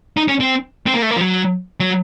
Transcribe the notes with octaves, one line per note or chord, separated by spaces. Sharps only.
D#4
C#4
C4
C4
A#3
A3
A#3
F3
F#3
F#3